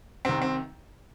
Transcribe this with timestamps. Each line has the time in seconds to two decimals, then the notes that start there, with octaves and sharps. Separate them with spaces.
0.25 C2 C3 D#3 C4
0.42 C4